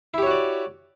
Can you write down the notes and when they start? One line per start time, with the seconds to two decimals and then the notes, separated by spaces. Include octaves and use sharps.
0.14 E4
0.18 G4
0.22 C#5
0.26 F#4
0.31 D5